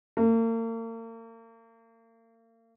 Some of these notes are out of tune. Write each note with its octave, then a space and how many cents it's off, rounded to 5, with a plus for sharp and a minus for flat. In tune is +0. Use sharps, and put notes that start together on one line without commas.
A#3 -40